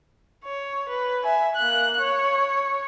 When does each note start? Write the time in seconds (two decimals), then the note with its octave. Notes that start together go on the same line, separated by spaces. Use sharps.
0.45 C#5
0.89 B4
1.23 E5 G#5
1.55 A#3 F#6
2.00 C#5